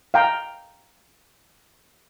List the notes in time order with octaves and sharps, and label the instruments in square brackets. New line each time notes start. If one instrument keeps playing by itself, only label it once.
[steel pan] F5 G5 A#5